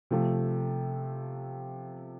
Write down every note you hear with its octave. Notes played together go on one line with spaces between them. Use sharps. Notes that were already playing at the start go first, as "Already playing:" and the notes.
C3 F3 A3